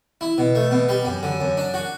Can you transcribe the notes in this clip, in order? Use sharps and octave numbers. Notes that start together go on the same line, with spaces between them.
E4
B2
A3
B2
G3
F#2
D3
F#2
D4
F#4